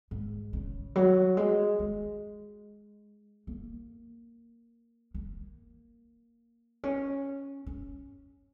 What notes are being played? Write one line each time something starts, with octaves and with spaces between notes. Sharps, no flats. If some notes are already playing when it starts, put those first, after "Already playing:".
G#2
C#3
F#3
G#3
G#3
A#3
A#3
C#4
C#4